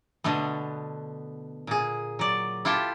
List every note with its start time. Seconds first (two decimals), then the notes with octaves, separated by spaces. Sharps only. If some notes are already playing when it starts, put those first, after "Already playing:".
0.24 B2 D3 A3 B3
1.67 A#2 G#4
2.19 F#3 D5
2.65 E4 F4 G4 A4